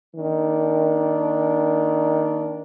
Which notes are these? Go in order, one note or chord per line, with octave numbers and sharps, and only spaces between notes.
D#3 A#3 D4